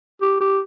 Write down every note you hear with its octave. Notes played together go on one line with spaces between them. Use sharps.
G4
G4